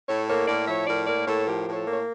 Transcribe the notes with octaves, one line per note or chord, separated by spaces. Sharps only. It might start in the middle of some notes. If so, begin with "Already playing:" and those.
A2 A4 C#5
A#3 A4 C#5
A2 A#4 D5
F3 C#5 E5
A2 A#4 D5
A#3 A#4 D5
A2 A4 C#5
F3 G4 A#4
A2
A4 C#5
A#3
C#5